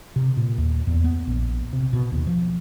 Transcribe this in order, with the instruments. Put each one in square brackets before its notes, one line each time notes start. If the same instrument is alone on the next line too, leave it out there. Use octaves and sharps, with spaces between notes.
[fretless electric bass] C3
A#2
D#2
E2
B3
A#1
C3
B2
D#2
F3